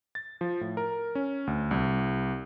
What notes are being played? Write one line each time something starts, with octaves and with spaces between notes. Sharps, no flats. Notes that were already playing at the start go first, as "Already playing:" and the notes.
A6
F3
A2
A#4
C#4
D2
C2